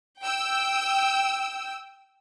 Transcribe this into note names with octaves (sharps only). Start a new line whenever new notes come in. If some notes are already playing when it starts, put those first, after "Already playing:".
G5 E6